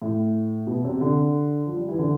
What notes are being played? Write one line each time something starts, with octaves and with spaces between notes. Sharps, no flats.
A2
B2
C3
D3
F3
G3
E3
D3